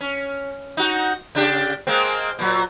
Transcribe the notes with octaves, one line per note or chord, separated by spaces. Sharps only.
C#4
D#4 F#4
C#3 D4 G4
G#3 A#3 C4
A#2 F#3